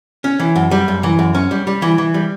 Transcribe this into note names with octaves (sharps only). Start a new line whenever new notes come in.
C#4
E3
F#2
G3
F#2
E3
F#2
C#4
G3
G3
E3
E3
G3